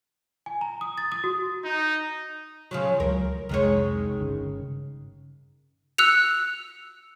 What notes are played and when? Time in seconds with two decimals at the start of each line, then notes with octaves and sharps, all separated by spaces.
0.46 G#5
0.61 A#5
0.81 D#6
0.98 A6
1.12 D#6
1.24 F#4
1.65 D#4
2.71 C#3 F3 F#3
3.00 C#2 F3 F#3 A#4
3.49 F1 C2 D#3 G#3 C#5
4.20 G1 C#3
5.98 E6 F#6 C#7 F7